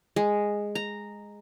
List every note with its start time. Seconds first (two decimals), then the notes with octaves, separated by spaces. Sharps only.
0.16 G#3
0.75 A#5